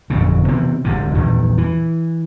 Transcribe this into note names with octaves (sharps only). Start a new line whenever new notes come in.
G1 F2 A#2 C#3
C3 E3 B3 C4
D1 G#2 C3
A#1 E2 G2 D#3
E3